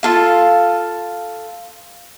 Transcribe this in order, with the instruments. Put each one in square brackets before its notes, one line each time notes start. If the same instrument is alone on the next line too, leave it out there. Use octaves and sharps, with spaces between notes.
[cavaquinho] F4 A4 F5